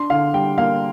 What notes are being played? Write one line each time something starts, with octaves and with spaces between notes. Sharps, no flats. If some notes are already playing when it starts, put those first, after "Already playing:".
Already playing: D4 C6
D3 F5
G3 G5
A#3 F5